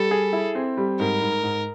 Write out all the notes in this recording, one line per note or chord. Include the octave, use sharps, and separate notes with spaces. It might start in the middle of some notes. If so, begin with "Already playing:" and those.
Already playing: G3 A4
G#4
E4
C4
G3
G#2 A#4
G#2
G#2